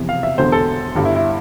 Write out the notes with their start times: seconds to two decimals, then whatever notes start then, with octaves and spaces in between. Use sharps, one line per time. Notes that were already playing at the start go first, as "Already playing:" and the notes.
Already playing: F1 E2 C3 E3
0.09 F5
0.23 E5
0.38 E1 E2 D3 C5
0.52 A4
0.95 G1 G2 D3
1.05 E4
1.15 E4